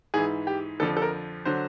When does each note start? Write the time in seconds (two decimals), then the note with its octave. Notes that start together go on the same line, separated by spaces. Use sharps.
0.14 G#2 E3 G#4
0.47 G4
0.80 F2 D3 F3 A4
0.97 A4
1.02 A#4
1.45 D3 F#3 C5